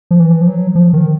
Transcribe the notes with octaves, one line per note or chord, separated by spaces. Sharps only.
F3
E3
F3
F#3
F3
D#3